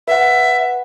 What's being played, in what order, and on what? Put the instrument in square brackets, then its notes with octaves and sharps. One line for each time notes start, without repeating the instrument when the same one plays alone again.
[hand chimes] B4 F#5 [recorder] E5